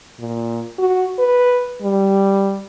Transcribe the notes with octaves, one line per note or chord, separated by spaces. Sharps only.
A#2
F#4
B4
G3